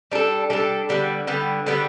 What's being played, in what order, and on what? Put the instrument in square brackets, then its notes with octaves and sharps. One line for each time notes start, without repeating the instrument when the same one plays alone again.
[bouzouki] G3 D4 A4
G3 D4 A4
D3 G3 B3
D3 G3 B3
D3 G3 B3